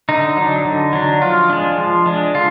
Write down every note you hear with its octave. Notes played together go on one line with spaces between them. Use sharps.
D3 D#4
F#3 D4
D3
F#3 D4
F3 F4
G#3 D4
F3
G#3 D4
D3 F4